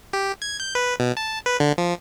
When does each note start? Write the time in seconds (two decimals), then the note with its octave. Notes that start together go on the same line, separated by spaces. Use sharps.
0.13 G4
0.42 G#6
0.60 G6
0.75 B4
1.00 B2
1.17 A5
1.46 B4
1.60 D3
1.78 F3